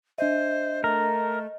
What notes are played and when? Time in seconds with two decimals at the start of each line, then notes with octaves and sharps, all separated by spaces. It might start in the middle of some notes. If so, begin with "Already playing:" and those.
0.18 D4 C5 D#5 E5
0.84 A3 A#4